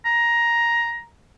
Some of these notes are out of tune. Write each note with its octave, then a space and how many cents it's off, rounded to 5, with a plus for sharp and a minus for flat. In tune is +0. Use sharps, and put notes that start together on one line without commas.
A#5 +10